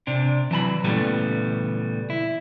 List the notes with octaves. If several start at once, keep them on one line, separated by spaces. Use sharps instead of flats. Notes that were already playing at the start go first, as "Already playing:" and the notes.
C3 D4
E3 F#3 A5 B5
A#2 C#3 E3 G3 A3 B3
E4